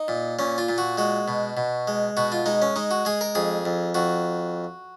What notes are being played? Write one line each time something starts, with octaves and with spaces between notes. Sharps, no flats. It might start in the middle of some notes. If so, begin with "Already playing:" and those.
Already playing: D#4
A#2
A#2 C#4
F4
A#2
F#4
G#3 F#4
B2
B2
G#3
B2 F#4
F4
G#3 D#4
C#4
G#3 D#4
F#4
G#3 G#4
A#4
F2 G#4
F2
F2 F#4